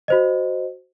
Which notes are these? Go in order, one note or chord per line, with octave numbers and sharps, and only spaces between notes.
F#4 C5 D#5